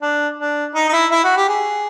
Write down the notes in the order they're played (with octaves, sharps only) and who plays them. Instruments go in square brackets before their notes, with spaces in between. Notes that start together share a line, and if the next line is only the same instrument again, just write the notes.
[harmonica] D4
D4
D#4
D#4
E4
E4
F#4
G4
G#4